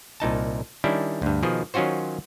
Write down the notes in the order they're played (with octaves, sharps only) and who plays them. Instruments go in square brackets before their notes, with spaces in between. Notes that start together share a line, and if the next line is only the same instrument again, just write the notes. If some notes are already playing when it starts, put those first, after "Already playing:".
[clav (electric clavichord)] C2 A#2 D#4 A5
D#3 G3 C#4 D4 E4
D2 G2
B2 D#3 F3 G#4
D#3 F#3 C#4 F4 F#4 C5